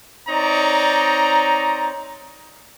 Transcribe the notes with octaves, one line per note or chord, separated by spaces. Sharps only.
C4 D#4 C#5 D5 A#5